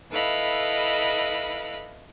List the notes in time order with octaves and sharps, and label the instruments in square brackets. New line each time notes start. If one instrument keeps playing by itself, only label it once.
[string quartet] E4 A4 B4 D#5 F5 B5